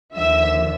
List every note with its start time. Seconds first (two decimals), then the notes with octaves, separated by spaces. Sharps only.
0.14 D#2 D3 F3 E5 E6